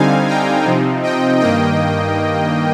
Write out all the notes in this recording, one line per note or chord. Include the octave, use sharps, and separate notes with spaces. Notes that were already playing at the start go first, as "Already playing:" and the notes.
Already playing: D3 G3 C4 D#4 F5 G#5
G5 A#5
C3 F3 C4 D#4
D#5 G5
G2 D#3 A#3 D#5 G5